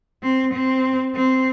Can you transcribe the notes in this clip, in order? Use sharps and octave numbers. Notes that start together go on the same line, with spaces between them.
C4
C4
C4